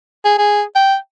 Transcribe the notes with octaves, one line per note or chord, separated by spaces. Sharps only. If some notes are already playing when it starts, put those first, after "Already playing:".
G#4
G#4
G5